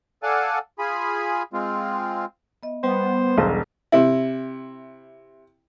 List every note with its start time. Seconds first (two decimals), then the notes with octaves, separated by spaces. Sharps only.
0.23 A4 D5 F5 F#5 G#5 A5
0.79 F4 G#4 G#5 B5
1.53 G#3 C4 F4
2.63 B3 D#5 E5
2.84 G3 B3 C5
3.37 E1 B1
3.92 C3 E4